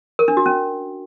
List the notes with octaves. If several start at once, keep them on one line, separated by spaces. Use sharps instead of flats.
A#4
D4
F#4
C#4